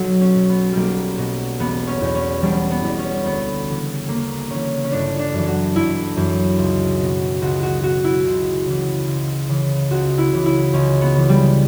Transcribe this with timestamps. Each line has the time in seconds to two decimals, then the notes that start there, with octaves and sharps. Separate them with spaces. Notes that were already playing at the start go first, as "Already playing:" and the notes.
Already playing: B1 F#3
0.21 C#4
0.35 B2
0.49 B3
0.72 B1 G3 A#3
1.18 B2
1.60 E1 B3
1.87 C#4
2.01 E2 B2
2.15 C#4
2.42 E1 G3
2.71 B3
2.84 E2 B2
2.99 C#4
3.25 D2 B3
3.68 C#3 E3
4.08 D2 A#3
4.50 C#3 E3 C#4
4.84 C#4
4.92 G1 D4
5.19 D4
5.34 F#2 E3
5.48 F#4
5.75 G1 E4
6.16 F#2 E3
6.58 C#2
7.00 B2
7.41 C#2 F#4
7.63 F#4
7.83 B2 F#4
8.04 E4
8.25 C#2
8.66 C#3 E3
9.07 C#2
9.49 C#3 E3
9.91 C#2 F#4
10.18 E4
10.32 C#3 E3
10.46 E4
10.73 C#2 C#4
11.01 B3
11.15 C#3 E3
11.29 G3